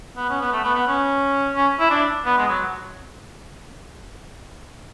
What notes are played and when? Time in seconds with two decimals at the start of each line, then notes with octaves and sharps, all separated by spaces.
0.17 B3
0.29 C#4
0.41 B3
0.52 A3
0.64 B3
0.75 B3
0.87 C#4
1.56 C#4
1.79 E4
1.90 D4
2.25 B3
2.37 G#3
2.48 F#3